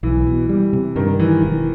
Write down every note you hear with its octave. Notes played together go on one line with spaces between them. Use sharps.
B1 E3
B2
G3
C3
G2 D#3
D#3 E3
E1 E3